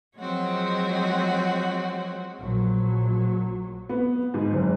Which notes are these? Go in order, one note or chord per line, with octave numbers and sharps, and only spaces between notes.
F3 F#3 G#3 C4 F#4 C#5
A#1 F#3
B3
G#2
F#1